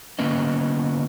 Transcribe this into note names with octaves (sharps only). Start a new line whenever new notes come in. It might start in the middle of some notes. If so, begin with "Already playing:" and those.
D3 A#3 B3 C#4 D#5